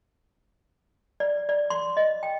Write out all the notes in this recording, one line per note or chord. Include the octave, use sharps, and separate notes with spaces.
D5
D5
C6
D#5
G5